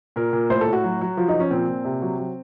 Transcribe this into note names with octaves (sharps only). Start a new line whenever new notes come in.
A#2 A#4
A#2
A2 C5
A4
A2
F#4
F#3
F#3
F3 F4
D#4
F3
C#4
A#2 C4
A#2
C3
F#3
F#3